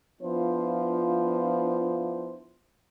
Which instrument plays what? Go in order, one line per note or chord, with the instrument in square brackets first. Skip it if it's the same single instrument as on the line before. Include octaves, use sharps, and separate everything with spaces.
[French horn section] F3 B3 D4 E4 F4 C5